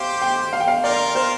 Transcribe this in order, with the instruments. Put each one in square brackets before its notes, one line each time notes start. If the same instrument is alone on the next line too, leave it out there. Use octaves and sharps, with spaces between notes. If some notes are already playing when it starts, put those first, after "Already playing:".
Already playing: [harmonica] G4 C5 [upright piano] F5
[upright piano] G5
F5
G5
F5
[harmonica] F4 A#4 [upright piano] D5
[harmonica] F4 A#4 [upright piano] C5